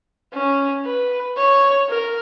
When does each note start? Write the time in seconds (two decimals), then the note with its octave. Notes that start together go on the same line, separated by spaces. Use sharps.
0.34 C#4
0.85 B4
1.37 C#5
1.89 A#4